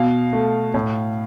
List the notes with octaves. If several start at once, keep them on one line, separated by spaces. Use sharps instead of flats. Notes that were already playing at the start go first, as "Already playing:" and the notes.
Already playing: B2 F5
A3
A2